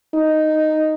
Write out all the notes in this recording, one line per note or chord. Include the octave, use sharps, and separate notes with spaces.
D#4